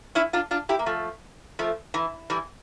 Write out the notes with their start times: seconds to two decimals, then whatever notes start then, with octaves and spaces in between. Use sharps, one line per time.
0.15 C#4 E4
0.33 D4 F4
0.51 D4 F4
0.69 E4 G4
0.79 A#3
0.86 F3 A3
1.59 F3 A3
1.94 E3
2.30 E3 G3